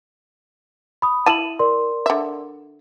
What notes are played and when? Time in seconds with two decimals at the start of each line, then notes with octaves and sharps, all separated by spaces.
1.02 B5 D#6
1.26 E4 A5 D#7 E7 F#7
1.59 A#4 D5 C6
2.06 D3 E5